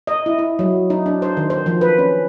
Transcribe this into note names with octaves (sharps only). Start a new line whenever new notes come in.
D#5
E4
E4
F#3
D#4
D4
C5
D#3
C5
F3
B4
C#4